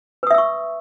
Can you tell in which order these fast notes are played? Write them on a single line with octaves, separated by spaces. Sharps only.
B4 D#6 E5 E6 C#6